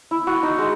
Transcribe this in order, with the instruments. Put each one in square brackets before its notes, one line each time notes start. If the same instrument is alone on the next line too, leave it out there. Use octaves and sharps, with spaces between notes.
[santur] E4
F#4
D#4
G#3